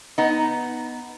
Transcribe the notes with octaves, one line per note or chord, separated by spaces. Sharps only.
B3 D#4